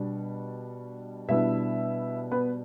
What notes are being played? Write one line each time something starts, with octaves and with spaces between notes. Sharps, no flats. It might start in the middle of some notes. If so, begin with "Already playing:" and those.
Already playing: B2 G3 D4
B2 G3 B3 D4 E4 E5
B3 B4